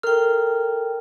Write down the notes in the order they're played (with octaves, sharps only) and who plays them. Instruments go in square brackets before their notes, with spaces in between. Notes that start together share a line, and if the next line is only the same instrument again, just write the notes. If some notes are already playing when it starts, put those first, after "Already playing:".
[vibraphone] A4 G5 [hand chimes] A#4 F6